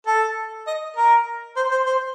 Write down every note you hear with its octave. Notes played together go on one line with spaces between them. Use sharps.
A4
D#5
A#4
C5
C5
C5